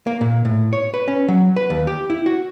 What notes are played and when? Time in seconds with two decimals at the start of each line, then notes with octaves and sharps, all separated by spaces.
0.07 A#3
0.21 A#2
0.45 A2
0.73 C#5
0.94 B4
1.08 C#4
1.28 F#3
1.56 B4
1.70 D#2
1.87 G4
2.10 E4
2.26 F#4